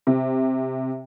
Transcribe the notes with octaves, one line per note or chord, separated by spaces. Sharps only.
C3